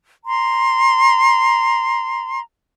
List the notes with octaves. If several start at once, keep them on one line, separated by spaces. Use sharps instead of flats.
A#5 C6